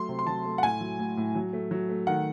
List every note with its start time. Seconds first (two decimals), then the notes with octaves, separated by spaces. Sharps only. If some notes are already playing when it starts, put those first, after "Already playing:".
Already playing: F#3 A3 C6
0.09 C3
0.19 C6
0.27 F#3 A5
0.45 A3
0.58 F#5
0.63 A2 G#5
0.81 F#3
0.99 A2
1.17 A2
1.35 F#3
1.53 A3
1.71 F#3
1.89 A3
2.07 D#3 F#5